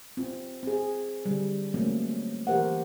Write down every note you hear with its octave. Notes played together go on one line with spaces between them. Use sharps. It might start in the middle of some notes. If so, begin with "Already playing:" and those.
C4 F4
C4 G#4
D3 G3
F#3 A3 A#3 C4 C#4
E3 G4 A#4 C5 F#5